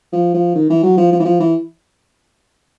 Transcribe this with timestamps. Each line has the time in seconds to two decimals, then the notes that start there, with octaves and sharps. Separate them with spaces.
0.12 F3
0.34 F3
0.55 D#3
0.70 E3
0.83 F#3
0.97 F3
1.12 F3
1.20 E3
1.25 F3
1.40 E3